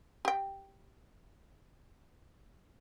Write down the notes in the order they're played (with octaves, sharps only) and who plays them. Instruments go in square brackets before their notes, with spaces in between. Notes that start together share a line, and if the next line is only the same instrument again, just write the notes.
[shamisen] G4 G5